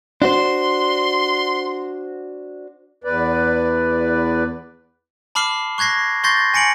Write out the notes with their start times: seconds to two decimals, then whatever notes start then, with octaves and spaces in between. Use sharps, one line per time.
0.22 D4 F#4 C5 C6
3.04 E2 B4 D5
5.35 A5 B5 D6 F6 C7 G7
5.78 C#6 F#6 G#6 A#6 C7
6.24 C6 C#6 G6 A6 A#6 C7
6.54 G#5 A#6 C#7 D7 F#7